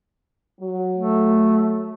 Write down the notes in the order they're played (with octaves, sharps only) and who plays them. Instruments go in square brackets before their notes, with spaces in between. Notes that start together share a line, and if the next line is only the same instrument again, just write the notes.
[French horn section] F#3
[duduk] A3